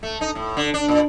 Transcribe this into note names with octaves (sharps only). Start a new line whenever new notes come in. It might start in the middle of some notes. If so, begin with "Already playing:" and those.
A3
D#4
A2
D3
D4
A#2